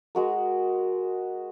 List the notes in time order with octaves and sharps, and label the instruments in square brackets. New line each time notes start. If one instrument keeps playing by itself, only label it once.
[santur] G#3 F#4 A#4